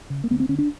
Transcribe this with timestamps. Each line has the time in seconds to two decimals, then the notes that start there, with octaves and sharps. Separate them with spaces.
0.10 C#3
0.24 A#3
0.30 D2 B3
0.40 C4
0.49 D3 C#4
0.58 D4